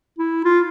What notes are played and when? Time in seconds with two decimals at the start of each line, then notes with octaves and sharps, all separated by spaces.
0.19 E4
0.45 F4